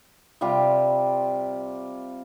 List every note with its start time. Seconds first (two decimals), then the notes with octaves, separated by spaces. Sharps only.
0.41 C3 G3 F4 G4